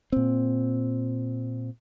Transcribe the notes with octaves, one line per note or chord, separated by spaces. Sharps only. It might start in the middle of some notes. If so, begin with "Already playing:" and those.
A#2 C4